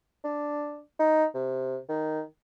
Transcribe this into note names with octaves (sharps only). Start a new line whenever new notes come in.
D4
D#4
C3
D#3